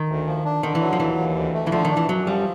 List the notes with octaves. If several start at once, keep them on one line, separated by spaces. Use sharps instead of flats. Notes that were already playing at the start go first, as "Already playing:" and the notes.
Already playing: D#3
D2
F3
D4
D3 D#3
E3
F#3
F3
D#2 E3
D#2
D2
A3
E3
D3 F3
D#3
D4
E3
F#2 F#3
F3 G3